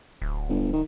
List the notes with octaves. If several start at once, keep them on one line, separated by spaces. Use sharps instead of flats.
D1
G1
D#3